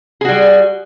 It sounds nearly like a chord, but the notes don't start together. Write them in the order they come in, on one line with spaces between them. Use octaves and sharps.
G#4 F#4 G3